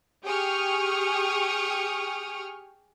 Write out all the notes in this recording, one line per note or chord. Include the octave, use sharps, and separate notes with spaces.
G4 G#4 G5 C#6 D#6 F6